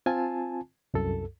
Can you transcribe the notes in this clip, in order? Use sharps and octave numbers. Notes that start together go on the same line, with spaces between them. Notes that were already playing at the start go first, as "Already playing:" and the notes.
C4 F4 G#5 A5
C2 F#2 A4